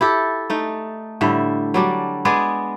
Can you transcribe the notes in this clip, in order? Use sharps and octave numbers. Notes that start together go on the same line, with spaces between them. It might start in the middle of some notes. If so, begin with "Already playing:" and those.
E4 G4 A4
A3 D#4
A2 D3 G3 E5
F#3 G3 D4
G#3 B3 G#4 D5